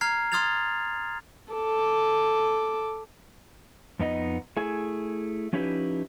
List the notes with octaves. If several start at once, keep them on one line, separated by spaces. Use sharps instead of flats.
A#5 F6 G#6 C7
C6 D#6 F6 G#6 A6 F7
A4 D6
F2 B3 D#4 D#5
A3 E4 G#4 G#5
F3 C#4 D#4 E4 G4 B4